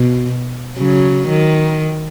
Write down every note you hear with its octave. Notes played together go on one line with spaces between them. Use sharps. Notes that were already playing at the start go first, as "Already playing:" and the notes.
Already playing: B2
C#3 F#3
D#3